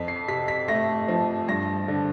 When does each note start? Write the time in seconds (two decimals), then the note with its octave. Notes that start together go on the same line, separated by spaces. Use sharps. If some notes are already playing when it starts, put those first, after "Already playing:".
Already playing: F2 B6
0.08 C7
0.28 C3 B6
0.48 B6
0.68 A3 A#6
1.08 F3
1.48 G2 A#6
1.88 D3